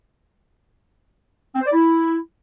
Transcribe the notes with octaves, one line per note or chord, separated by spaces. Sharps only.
C4
C5
D5
E4